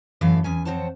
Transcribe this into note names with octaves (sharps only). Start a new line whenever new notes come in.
F#2 A2 E3 E4 A4 F5
E2 C#4 G#5
F2 C4 C5 C#5 F#5 A5